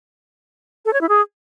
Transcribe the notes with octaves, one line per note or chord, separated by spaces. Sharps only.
A4
C#5
E4
G#4